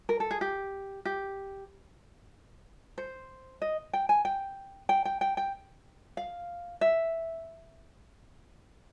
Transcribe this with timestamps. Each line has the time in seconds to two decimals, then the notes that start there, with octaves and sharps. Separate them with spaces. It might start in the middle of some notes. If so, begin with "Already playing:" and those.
0.09 A#4
0.20 A4
0.31 G#4
0.41 G4
1.05 G4
2.98 C5
3.62 D#5
3.93 G5
4.09 G#5
4.25 G5
4.89 G5
5.05 G5
5.21 G5
5.37 G5
6.17 F5
6.81 E5